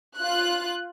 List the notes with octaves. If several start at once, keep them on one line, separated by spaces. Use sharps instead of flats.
F4 F#6